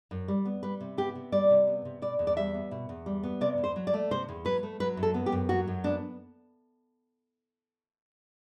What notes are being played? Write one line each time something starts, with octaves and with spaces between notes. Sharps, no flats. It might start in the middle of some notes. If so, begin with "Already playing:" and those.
F#2
G3
B3
G3 B4
C3
B3 G4
C3
G3 D5
C3
B3
C3
B2 D5
E2
D5
G3 E5
B3
B2
E2
G3
B3
C3 D5
E2
C5
F#3
D5
A3
C3 C5
E2
F#3 B4
A3
F#3 B4
F#2
A4
B3
G4
F#2
F#3 F#4
F#2
B3 D4